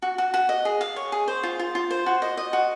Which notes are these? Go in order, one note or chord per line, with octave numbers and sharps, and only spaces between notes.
F#4
F#4
F#4
D#5
G#4
F5
C#5
G#4
C5
F4
F4
F4
C5
F#4
D#5
D#5
F#4